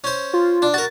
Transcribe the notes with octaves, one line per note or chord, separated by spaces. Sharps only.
C#4 C5
F4
D4
F#4 A#4 A6